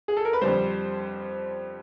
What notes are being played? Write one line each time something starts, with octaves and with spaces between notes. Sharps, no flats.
G#4
A4
A#4
B4
F2 D3 G3 C5